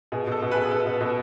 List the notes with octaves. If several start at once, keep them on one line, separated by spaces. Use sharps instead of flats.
B2 G#4
B2 A4
B2
G#4 B4
B2
G#4
B2 A4
B2
B2